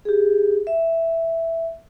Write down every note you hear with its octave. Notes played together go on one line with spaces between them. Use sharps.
G4 G#4
E5